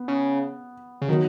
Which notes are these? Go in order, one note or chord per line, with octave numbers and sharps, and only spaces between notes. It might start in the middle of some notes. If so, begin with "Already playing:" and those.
Already playing: B3
C#3
C#3
D#3 F#3 B3 D#4 A#4